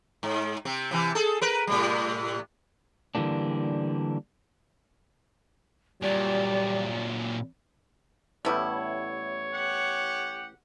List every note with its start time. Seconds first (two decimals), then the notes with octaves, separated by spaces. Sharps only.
0.23 G#2
0.65 C3 C4
0.91 C3 E3
1.15 G#4 A4
1.41 A#4 B4
1.67 A2 C3 G3
3.15 D3 E3 G3 A#3 D4
6.02 A#2 F#3 G3 D5
8.45 A1 A2 G3 B3 E4 C#5
9.53 G4 F#5